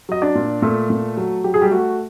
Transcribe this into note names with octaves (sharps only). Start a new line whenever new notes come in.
F#3 D#5
D4 D5
A#2
A#2 A3 A4
A#2
F#3
F#3 G4
G#4
G3 G4
A3 F#4